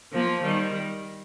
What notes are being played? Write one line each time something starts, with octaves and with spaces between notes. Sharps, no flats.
F3 A#3
D#3 G3